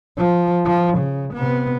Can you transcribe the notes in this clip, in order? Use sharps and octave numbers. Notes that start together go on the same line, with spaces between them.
F3
F3
C#3
C3 B3